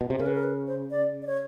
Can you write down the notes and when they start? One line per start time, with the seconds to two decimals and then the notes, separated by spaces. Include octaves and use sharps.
0.01 B2
0.10 C3
0.19 C#3 A#4
0.27 B4
0.35 A#4
0.43 B4
0.67 C5
0.91 D5
1.22 D5
1.27 C#5